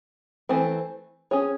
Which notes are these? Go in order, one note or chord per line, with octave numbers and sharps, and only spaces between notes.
E3 A3 C4
C#4 G#4 C#5